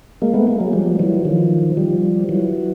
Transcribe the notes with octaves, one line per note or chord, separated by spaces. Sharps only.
G#3 A#3
A3 B3
G#3 A#3
F#3 G#3
F3 G3
E3 F#3
D#3 F3
F3 G3
E3 F#3